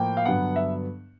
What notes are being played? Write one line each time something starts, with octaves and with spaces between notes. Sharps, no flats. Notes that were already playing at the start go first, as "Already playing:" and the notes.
Already playing: A2 F3 A#3 G5
F5
G2 D3 F#3 B3 F#5
E5